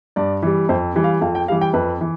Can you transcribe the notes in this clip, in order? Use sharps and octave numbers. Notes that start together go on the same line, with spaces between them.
G2 D5
E3 G3
F2 C5
E3 G3
F5
F2 F5
G5
E3 G3 F5
G5
F2 B4
E3